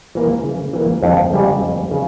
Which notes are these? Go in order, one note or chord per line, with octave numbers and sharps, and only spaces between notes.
E3 A#3
C#3
E3 A#3
F2
C#3 G3
F2
C#3